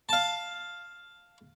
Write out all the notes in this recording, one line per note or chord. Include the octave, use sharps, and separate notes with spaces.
F5 A5